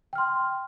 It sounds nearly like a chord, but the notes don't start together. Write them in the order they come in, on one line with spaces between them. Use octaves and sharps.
G5 F6 C6